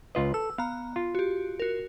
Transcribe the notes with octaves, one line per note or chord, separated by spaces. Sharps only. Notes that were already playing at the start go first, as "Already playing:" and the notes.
C#2 F4 B4 D#5
A4 E6
B3 F5 A#5
F4
F#4 G4
F#4 A#4